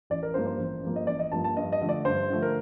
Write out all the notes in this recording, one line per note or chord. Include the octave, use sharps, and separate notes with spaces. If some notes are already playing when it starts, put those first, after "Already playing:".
A1 D5
A#4
G2 F3 A#3 C5
C5
A1
G2 F3 A#3
D#5
A1 D5
D#5
G2 F3 A#3 A5
A5
G2 D#5
D#5
D3 F3 A3
D5
G2 C5
D3 F3 A3
A#4